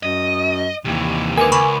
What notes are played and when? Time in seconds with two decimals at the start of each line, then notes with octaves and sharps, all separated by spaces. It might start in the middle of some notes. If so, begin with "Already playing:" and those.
0.03 F#2 D#5
0.85 D#2 C3 E3
1.37 D3 G#3 A#4 B4 G#5 D6
1.52 C#2 B5 C#6